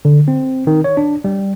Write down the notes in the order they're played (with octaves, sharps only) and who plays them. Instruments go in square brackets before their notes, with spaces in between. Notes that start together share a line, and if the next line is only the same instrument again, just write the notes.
[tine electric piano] D3
C4
D#3
C#5
D4
G3